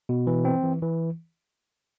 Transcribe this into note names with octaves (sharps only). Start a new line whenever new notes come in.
B2
E3
C4
E3
E3